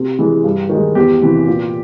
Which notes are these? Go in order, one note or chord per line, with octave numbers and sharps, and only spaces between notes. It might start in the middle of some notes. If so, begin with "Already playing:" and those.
Already playing: C3
E3 G#3
G2
D#3
G#3
E2 G4
C3 E3
A#2